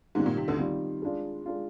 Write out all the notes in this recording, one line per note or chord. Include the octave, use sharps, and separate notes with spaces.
G#2 D#3 G3 G#3 C4 F4
A#2
C3
D2 D3
D#3 G3 C4 F4
G#3 D4 F4
G#3 D4 F4